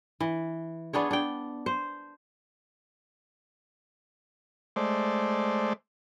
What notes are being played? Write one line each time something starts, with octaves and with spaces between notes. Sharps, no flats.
E3
B3 D4 G#4 C#5
D4 G5
C5
G#3 A3 C5 D5